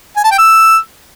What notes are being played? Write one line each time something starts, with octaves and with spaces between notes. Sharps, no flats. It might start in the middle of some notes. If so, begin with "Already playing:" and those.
G#5
A5
G5
E6